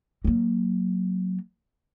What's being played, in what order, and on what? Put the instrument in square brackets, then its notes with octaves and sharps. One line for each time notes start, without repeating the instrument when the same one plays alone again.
[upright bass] F#3 A#3